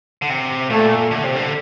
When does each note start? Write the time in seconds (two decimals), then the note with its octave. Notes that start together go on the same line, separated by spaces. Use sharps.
0.22 D3
0.30 C3
0.70 A#2 A3
1.11 D3
1.24 C3
1.36 D3